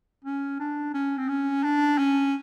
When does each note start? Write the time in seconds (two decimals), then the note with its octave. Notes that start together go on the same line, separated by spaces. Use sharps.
0.25 C#4
0.59 D4
0.94 C#4
1.17 C4
1.29 C#4
1.63 D4
1.98 C#4